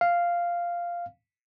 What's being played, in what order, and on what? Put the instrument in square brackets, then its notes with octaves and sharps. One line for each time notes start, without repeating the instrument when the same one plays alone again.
[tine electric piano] F5